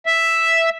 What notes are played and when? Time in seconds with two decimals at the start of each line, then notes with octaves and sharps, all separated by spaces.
0.06 E5